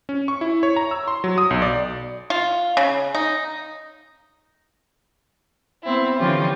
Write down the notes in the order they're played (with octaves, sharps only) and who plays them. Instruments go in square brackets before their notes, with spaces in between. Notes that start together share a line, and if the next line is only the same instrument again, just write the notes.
[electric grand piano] C#4
C#6
E4
C#5
A#5
E6
C6
F#3
D#6
B1
D5
[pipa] F4
C#3
D#4
[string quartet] B3 C4 E4
D3 E3 F3 C#4 F4 G4